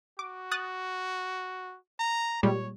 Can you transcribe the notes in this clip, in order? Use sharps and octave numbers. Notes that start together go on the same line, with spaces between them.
F#4 D6
D#6 F#6 A6
A#5
A#2 G3 G#3 C#5